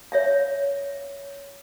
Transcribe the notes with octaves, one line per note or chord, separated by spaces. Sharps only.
C#5 E5 F5